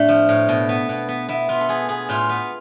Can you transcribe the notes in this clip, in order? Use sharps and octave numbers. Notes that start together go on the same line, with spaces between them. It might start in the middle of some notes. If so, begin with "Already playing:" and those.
Already playing: A2 A3 C4 D4
F3
A2
B2
B3
B2
B3
B3 E4
B3 F4
A4
B3 G#4
B3 G#4
A2 F4
B3